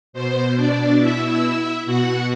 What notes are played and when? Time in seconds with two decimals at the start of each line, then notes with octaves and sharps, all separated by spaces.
0.13 B2 C5
0.56 D4 D5
1.00 E4 E5
1.86 B2 F#4 F#5